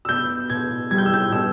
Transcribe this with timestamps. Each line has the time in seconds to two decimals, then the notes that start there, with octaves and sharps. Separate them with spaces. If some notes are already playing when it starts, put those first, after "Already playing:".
0.05 E6
0.09 B3 G6
0.50 B2 G#6
0.91 G3 G#6
0.98 G6
1.06 E6
1.14 G6
1.32 B2 E6